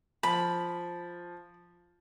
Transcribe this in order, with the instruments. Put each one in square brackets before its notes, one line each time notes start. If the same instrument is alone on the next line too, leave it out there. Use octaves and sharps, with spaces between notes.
[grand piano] F3 [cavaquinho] B5